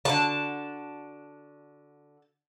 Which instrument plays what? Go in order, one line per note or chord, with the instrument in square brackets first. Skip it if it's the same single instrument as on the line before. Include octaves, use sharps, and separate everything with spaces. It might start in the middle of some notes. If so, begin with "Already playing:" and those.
[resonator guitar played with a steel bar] D3 F#4 [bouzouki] A5